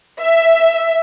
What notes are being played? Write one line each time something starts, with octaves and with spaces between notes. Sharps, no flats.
E5